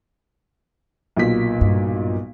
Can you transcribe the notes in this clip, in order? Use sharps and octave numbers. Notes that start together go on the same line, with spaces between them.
B1 A#2 B6
G2